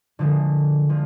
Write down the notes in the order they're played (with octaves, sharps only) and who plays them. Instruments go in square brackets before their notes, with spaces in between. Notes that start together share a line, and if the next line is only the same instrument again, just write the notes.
[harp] D3 F3 G#3
D3 F3